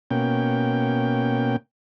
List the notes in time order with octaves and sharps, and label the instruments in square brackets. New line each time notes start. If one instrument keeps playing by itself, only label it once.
[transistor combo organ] B2 A#3 C#4 G5